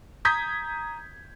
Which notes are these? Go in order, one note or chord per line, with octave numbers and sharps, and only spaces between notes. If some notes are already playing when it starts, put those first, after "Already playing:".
A#5 D#6 G6 G#6 B6